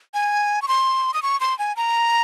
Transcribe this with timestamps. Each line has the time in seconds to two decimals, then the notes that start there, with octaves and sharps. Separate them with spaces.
0.14 G#5
0.62 C#6
0.68 C6
1.14 D#6
1.23 C#6
1.40 C6
1.59 G#5
1.76 A#5